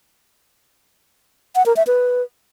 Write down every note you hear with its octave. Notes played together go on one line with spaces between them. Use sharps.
F#5
A#4
E5
B4